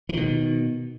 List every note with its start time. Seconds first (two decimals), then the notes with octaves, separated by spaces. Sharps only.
0.09 E3
0.13 D#3
0.17 B2